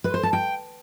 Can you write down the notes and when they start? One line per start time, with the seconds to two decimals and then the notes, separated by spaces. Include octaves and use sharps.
0.04 B4
0.14 C5
0.23 A5
0.33 G5